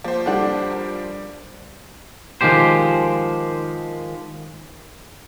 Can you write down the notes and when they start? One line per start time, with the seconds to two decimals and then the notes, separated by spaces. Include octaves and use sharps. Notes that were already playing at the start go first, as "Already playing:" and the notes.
0.04 F3 A#3 C5
0.26 G3 D4 A4 F#5
0.71 A#4
2.41 D#3 F3 G#3 G4 C5